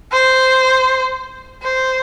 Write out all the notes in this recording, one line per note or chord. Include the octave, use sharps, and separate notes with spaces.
C5
C5